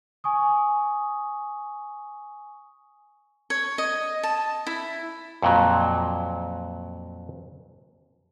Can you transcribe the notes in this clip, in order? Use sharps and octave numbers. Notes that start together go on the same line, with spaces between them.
G#5 C#6 D#6
C#5
D#5
A5
E4
F2 A#2 F#3